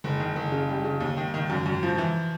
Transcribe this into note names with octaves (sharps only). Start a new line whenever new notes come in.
F#1
D#3
F#1
C#3
G3
C#3
D#2
D#3
D#3
F#2
F#2
F3
E3